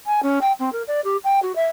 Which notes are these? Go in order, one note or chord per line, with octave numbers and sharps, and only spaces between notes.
G#5
C#4
G5
C4
A#4
D5
G4
G5
F#4
E5